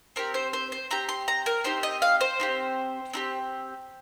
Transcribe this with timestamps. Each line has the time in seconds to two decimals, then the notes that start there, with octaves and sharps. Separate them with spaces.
0.16 C4 G4 A#4
0.34 C5
0.53 C5
0.72 C5
0.91 C4 G4 A#5
1.09 C6
1.28 A#5
1.46 A#4
1.64 C4 D#4 G4 C5
1.83 D#5
2.02 F5
2.21 C5
2.40 C4 D#4 G4
3.14 C4 D#4 G4